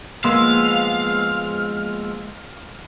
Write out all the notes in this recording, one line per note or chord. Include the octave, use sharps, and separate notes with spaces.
F3 G#3 A#3 B3 F5 C6 E6